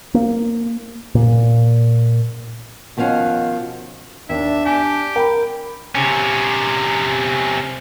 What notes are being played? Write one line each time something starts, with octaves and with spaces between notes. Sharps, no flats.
A#3
A#2
B2 D#3 F3 C#4 F5 F#5
D#2 D4 E5
G4 G#5
A#4 G5 B5
C3 C#4